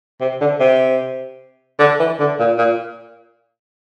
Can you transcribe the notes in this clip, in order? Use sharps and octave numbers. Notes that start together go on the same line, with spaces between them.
C3
D3
C3
D3
E3
D3
A#2
A#2